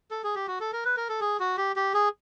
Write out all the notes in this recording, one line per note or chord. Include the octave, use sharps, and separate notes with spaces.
A4
G#4
G4
F#4
A4
A#4
B4
A#4
A4
G#4
F#4
G4
G4
G#4